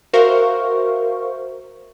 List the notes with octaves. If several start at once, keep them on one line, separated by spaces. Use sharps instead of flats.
F#4 A#4 C5 E5 F5 C#6